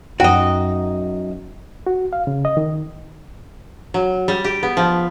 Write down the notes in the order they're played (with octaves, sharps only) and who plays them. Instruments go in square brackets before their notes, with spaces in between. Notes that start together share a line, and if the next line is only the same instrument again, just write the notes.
[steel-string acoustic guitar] F#2 D#4 [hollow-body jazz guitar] F#4 D#5 [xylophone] G5
[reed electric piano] F#4
F5
C#3
D#5
D#3
[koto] F#3
G3
G4
B3
F3